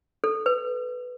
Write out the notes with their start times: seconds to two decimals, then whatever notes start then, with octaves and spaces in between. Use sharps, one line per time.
0.24 A4
0.46 B4